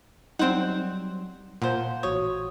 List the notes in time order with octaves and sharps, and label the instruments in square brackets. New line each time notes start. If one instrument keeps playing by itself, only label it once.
[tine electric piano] F#3 G3 [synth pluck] C4 D#4 [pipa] C5 F#5
[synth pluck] A#2 [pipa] F3 C5 [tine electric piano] F#5
[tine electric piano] A1 F#4 D#6 [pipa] C#5